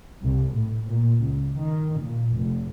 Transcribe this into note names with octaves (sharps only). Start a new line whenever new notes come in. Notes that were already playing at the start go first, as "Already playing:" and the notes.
C2
A2
A#2
C#2
D#3
A#2
F1